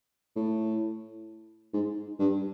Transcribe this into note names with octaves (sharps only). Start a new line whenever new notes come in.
A2
G#2
G2